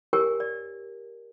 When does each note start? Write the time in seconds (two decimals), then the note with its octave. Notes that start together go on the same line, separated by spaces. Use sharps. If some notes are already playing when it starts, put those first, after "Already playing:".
0.13 G4 A#4 C#5 G#5
0.40 D5